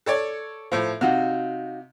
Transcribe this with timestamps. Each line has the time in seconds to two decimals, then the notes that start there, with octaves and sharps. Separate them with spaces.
0.06 A4 C#5 D5
0.72 A2 F3
1.01 C3 D#4 F#4 F5